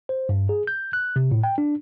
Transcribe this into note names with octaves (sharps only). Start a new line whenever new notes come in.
C5
G2
G#4
G6
F#6
C3
A2
G5
D4